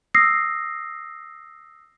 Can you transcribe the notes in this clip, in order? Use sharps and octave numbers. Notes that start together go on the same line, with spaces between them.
D#6 E6 A#6 C7